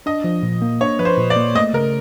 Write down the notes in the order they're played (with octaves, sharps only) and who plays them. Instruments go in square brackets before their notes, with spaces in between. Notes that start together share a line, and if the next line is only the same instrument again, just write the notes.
[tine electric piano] D4 [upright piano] D#5
[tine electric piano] F3
A#2
A#3
[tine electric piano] D4 [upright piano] C#5
[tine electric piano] F3 [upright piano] B4
[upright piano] C5
[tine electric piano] A#2
[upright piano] D5
[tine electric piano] A#3
[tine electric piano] A3 [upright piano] D#5
[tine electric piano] C#3 [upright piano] A#4